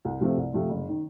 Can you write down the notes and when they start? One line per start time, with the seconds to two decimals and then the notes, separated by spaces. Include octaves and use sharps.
0.05 C2
0.21 C3 F3 A3 C4
0.37 C2
0.53 C3 F3 A3 C4
0.69 F#1
0.88 D#3